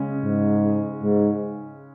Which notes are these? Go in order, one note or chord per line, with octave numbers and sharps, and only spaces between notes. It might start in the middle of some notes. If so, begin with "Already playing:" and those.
Already playing: C#3 G#3 C#4
G#2
G#2